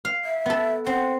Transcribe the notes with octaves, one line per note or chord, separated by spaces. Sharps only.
F5
E5
B3 A4
C4 F#5